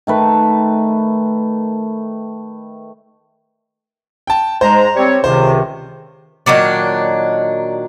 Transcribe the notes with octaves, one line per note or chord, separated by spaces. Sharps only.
D#3 A3 B4
G5 A5
G#2 G#3 C5 A#5
G3 C4 C#5
C#2 C3 D#3 C5
A#2 D#3 F#3 D4